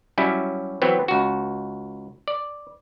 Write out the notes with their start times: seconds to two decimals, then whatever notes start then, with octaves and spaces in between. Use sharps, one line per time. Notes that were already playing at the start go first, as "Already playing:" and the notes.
0.18 F#3 G3 C#4 E4
0.82 E3 F#3 B3 C4
1.08 C#2 F#4
2.28 D5